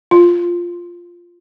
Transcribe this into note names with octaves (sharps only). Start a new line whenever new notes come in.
F4